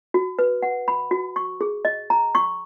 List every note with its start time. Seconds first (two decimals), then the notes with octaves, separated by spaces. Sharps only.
0.14 F#4
0.39 B4
0.63 F#5
0.88 B5
1.11 F#4
1.36 C#6
1.61 G#4
1.85 D#5
2.10 A#5
2.35 C#6